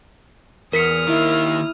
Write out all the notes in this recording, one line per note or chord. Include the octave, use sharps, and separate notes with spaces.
E2 A#4 D#6 F6 B6 C#7
D#3 A#3 E4